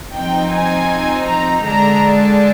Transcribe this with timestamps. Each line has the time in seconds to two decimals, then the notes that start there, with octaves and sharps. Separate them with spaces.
0.14 F3 C4 D#4 G5
0.52 G#5
1.27 A#5
1.65 D3 G#3 D4 A#5